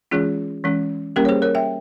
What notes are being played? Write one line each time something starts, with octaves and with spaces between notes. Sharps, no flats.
E3 G#3 C#4 F4 G#4
E3 G#3 C#4
G3 A#3 C#4 G4 A#4
C#5
G#4 C5
A#4 C#5
E5 G5